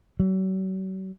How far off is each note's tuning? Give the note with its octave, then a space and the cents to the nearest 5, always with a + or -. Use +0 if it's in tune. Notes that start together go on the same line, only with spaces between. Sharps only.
F#3 +40